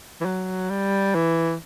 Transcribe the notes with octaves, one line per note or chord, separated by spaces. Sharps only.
E3
F#3
G3
E3